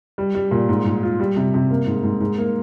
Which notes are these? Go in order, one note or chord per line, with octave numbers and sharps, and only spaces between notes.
G3
G3
A#2
G#2
G#2
F4
G3
C3
C3
A#3
G#2
G#2
G#2
A#3